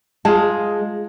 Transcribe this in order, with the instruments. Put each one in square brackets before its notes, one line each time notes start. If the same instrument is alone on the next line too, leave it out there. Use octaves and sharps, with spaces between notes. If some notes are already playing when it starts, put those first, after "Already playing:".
[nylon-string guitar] G#3 [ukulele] F4 G#4 A5